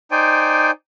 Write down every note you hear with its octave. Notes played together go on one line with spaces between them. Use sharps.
D#4 C5 D5 G5 G#5